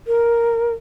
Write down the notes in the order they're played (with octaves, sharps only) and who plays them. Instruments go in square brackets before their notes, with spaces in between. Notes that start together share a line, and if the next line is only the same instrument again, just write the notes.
[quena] A#4